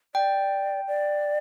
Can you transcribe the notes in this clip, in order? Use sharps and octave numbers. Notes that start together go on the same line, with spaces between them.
D5 G5
D5